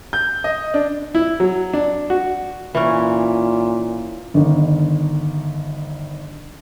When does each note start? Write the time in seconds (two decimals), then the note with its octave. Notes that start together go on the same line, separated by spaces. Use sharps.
0.13 G6
0.44 D#5
0.74 D4
1.15 E4
1.40 F#3
1.74 D4
2.10 F#4
2.75 A#2 E3 C#4
4.34 G1 D#3